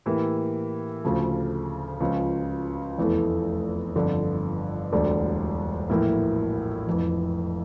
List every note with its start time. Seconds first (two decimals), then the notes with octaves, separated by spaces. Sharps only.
0.06 A2 E3 A#3 E4 G4
1.03 D2 C#3 F3 A3
2.01 C#2 C#3 F3 C#4
2.98 F1 E2 E3 A3
3.95 G1 F2 D3
4.92 E1 D2 D3 G3 D4
5.89 A#1 A2 E3 A#3 E4
6.87 F1 F2 E3